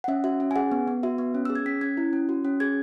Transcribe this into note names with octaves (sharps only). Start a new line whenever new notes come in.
F#5
C#4 E5
F#4 E5
C#4
G#5
G#4 F#5
B3
B3
F#4 E5
B3
C#4
E6
G#4
G#6
C#4 B6
C#4 G#6
E4
C#4
F#4
C#4
G#4 G#6